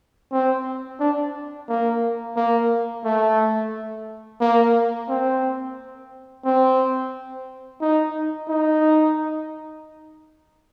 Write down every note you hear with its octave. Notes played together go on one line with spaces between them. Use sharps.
C4
D4
A#3
A#3
A3
A#3
C4
C4
D#4
D#4